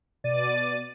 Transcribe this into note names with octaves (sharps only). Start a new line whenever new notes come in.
B2 D5 A6 D#7